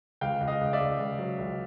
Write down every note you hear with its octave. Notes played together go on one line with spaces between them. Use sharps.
C#2 F5 G5
C#2
D#5 F5
C#2
D5 E5
C#2
C#2
F#3
C#2